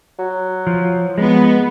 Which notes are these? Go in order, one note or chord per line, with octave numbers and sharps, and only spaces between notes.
F#3
F3
G#3 B3